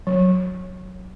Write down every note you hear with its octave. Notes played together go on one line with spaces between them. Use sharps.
F#3